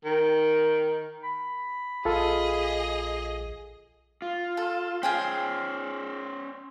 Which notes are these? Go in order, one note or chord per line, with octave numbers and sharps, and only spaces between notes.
D#3
B5
A#1 F4 G#4 A4 D#5 F5
F4
A4
C#4 F4 G#4 C5 G5